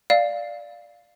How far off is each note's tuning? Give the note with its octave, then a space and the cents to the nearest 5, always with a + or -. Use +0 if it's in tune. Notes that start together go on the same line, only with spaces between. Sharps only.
D5 +0 F5 +0